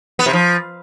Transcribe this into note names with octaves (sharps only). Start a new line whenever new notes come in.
B3
C3
F3